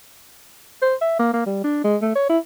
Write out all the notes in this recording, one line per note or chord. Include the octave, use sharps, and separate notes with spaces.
C5
E5
A#3
A#3
G3
D4
G#3
A3
C#5
E4